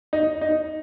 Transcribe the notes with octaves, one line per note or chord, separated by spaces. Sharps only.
D#4
D#4